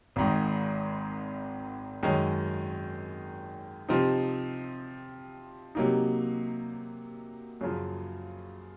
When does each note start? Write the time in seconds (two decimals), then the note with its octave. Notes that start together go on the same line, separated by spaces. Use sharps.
0.16 G#1 G#2 D#3
2.03 F#2 D#3 G#3 C#4
3.89 C3 F3 C4 D#4
5.75 C3 F#3 A#3 D#4
7.61 F#2 C#3 F3